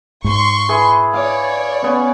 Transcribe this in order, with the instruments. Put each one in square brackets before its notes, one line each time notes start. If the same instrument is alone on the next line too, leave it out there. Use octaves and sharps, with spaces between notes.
[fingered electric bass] G#2 [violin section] C6 C#6
[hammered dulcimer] E4 G#4 B4
[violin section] C#5 D5 [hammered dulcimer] F5 D6
[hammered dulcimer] B3 C#4